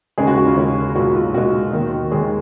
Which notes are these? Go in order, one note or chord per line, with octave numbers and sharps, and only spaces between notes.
D#2 C#3 G#3 C#4 G#4
F#4
F#4
F4
D#2 C#3 G#3 C#4
B1 A#2 G#3 F#4
F4
B1 A#2 G#3 F#4
D#2 D#3 A#3
D#2 D#3 G#3 A#3 G#4